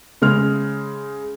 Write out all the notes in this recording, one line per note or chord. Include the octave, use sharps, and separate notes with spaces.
C#3 G#3 F6